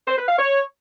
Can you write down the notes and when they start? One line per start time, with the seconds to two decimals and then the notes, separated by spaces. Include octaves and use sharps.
0.08 C5
0.18 B4
0.28 F5
0.39 C#5